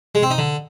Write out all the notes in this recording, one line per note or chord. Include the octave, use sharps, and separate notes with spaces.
G#3
C4
D#4
D3